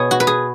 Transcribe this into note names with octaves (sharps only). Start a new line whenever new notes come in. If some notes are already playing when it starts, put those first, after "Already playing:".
Already playing: B2 B3 G#4 C#5
F#4
B4
G#4